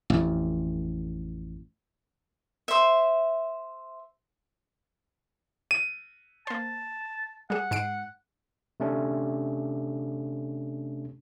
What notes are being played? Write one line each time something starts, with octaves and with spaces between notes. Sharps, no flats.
A1 F2
C5 E5
D#7
A#3 C5 A5
G3 G#4 F#5
G#2 C7 D7
C3 A3 C#4 D4